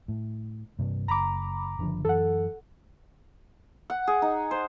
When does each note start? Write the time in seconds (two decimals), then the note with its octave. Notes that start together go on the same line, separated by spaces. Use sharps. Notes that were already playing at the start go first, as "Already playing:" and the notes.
0.08 A2
0.79 G2 C3 G3
1.08 F#1 A#5 B5 D6
1.79 F#1 D3 F3
2.05 F#2 E3 A4 F#5
3.90 F#5
4.08 G#4
4.22 D#4
4.51 C5